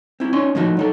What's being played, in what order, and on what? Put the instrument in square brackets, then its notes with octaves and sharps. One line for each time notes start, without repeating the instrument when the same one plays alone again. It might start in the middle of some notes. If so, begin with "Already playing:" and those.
[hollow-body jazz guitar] C4 E4
C#4 D#4 C6
A2 F3 D#4 F#4
F#3 D#4 A4